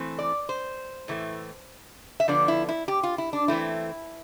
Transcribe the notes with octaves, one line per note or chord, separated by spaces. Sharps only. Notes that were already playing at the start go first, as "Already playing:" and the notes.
Already playing: E3 A3 C4
D5
C5
A2 E3 A3
E5
D3 F3 B3 D4 D5
E4
E4
G4
F4
E4
D4
E3 A3 C4 E4